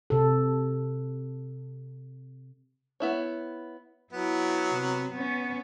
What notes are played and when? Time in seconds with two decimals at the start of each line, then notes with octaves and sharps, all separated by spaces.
0.10 C3 A4
3.00 B3 E4 C#5
4.13 F#3 B3 E4
4.74 C3
5.12 B3 C#4